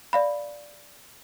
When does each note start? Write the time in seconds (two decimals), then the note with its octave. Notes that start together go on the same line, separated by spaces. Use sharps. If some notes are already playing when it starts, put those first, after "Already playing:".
0.13 D5 F5 B5